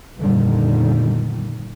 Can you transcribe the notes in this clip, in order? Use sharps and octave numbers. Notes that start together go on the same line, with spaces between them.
G1 F2 A#2 D3 D#3 G3